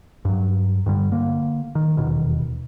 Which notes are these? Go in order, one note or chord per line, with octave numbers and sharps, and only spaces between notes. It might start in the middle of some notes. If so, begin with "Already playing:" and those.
G2 F#3
G2 D3 G3
D3 A#3
D#3
D#1 E2 B2 D#3